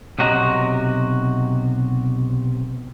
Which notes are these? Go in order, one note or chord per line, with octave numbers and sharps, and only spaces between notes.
B1 C3 F#4 D#5 A#5